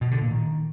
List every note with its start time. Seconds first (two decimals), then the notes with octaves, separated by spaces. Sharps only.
0.01 B2
0.11 D3
0.21 A#2
0.31 D#3